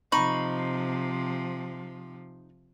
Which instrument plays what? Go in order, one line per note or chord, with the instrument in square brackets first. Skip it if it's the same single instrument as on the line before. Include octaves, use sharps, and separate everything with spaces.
[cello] C3 F3 [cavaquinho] D#4 B5 C#6